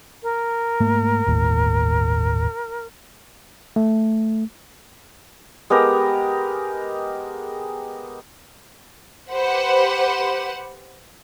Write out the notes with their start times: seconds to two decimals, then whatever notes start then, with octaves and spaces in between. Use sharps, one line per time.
0.23 A#4
0.80 G#2 A3 A#3
1.26 G1 D#2 A2
3.76 A3
5.70 G#3 B3 G4 A#4
9.31 G4 B4 C5 F#5